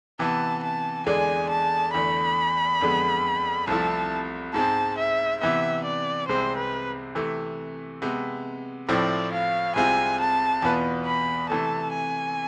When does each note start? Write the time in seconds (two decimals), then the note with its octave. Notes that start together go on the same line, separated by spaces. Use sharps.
0.19 C3 E3 B3 A5
0.63 A5
1.06 E2 D3 G#3 D4 G#5
1.50 A5
1.94 E2 D3 A3 B5
2.81 F2 D3 G#3 B3
3.67 C2 C3 F3 A3 E4 A5
4.54 G#2 G#3 C4 A5
4.98 E5
5.41 C3 E3 B3 E5
5.84 D5
6.28 C2 C3 G#3 C4 C5
6.57 B4
7.15 C3 E3 A3
8.02 C3 G#3 B3
8.89 A2 F3 A3 C4 E4 D5
9.33 F5
9.76 C2 C3 G#3 C4 F4 G#5
10.20 A5
10.62 E2 B2 B3 F4 B4
11.06 B5
11.49 C3 E3 A3 A5
11.93 G#5